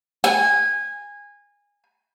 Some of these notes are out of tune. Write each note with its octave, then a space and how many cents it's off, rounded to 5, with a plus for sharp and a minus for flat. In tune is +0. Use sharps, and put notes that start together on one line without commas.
G#5 -20